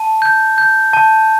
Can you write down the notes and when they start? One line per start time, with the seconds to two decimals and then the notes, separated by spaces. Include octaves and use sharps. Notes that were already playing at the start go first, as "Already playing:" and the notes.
Already playing: A5
0.22 G6
0.58 G6
0.93 A5